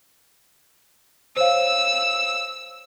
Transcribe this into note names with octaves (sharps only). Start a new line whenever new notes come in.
C5 C#5 F5 E6